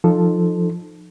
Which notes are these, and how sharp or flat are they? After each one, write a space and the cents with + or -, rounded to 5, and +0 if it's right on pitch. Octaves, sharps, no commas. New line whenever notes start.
F3 +0 D#4 -25 A4 +0